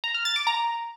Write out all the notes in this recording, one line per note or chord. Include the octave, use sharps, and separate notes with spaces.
A#5
F6
A6
D6
A#5